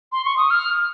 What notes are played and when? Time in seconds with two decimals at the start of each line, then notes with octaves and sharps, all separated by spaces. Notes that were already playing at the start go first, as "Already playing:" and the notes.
0.12 C6
0.25 C#6
0.37 D#6
0.50 F6